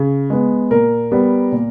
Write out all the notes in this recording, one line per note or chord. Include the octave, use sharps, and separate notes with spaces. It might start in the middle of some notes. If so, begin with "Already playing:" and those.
Already playing: C#3
G#3 B3
A#2 A#4
G3 B3
A#2